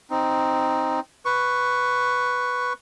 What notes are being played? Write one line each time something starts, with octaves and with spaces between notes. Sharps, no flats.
C4 D#4
B4 C#6